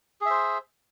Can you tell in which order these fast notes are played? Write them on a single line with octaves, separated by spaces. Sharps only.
G#4 E5 C5